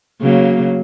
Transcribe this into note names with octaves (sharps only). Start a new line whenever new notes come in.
C#3 F#3 A#3